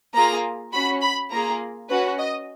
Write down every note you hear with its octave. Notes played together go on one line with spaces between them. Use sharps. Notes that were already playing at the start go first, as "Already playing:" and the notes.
A#3 F4 G#4 A#5
C#4 F#4 B5
B5
A#3 F4 G#4 A#5
C#4 F#4 B4
D#5